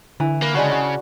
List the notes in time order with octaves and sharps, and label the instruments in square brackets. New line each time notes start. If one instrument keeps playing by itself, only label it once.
[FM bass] D3 [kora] E3
[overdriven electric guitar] A#3 [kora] B4
[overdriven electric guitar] C#3 [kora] G#3 D4 F#4
[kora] F#4